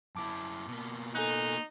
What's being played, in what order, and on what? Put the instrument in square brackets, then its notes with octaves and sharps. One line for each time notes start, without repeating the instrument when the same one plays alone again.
[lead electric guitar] F#2 E4 [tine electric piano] A5 D6
[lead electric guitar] B2 A#3
[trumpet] D#4 [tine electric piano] A4 G#5 F#6